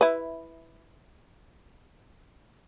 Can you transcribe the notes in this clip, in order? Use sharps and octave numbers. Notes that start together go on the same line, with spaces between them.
E4 B4